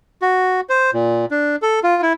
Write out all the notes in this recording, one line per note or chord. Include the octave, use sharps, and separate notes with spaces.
F#4
C5
A#2
D4
A4
F4
E4